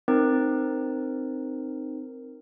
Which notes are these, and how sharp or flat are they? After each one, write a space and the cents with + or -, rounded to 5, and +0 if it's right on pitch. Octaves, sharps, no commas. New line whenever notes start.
C4 +0 D#4 -20 A#4 +0